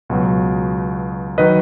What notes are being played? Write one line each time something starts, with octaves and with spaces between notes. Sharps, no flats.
C#2 B2 F#3
D#3 F#3 B4 D#5